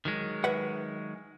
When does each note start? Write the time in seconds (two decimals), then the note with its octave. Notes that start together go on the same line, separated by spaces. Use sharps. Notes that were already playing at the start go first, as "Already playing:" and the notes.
0.05 D#3 F#3 G#3
0.44 B4 E5 F#5